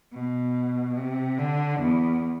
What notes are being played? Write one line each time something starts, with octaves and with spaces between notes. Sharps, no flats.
B2
C3
D3
E2